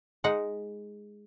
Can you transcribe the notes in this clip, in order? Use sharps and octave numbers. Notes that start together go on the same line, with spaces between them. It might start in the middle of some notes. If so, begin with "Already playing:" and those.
G#3 D#4 F#5